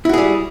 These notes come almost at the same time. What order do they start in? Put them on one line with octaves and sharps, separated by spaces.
E4 F#4 G#4 G3